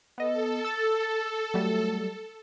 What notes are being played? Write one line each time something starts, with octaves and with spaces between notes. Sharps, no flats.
B3 A4 D#5
E6 A6
F#3 G3 A3